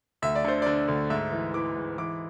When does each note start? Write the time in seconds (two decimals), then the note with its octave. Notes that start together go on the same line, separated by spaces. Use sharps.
0.22 D2 E5
0.35 D5
0.44 D3 C5
0.62 D3 D5
0.88 D2
1.10 G#2 E5
1.32 E3
1.54 E3 D6
1.76 G#2
1.98 E3 D6